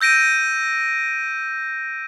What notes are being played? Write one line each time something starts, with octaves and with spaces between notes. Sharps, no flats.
E6 G6 A#6 D7 D#7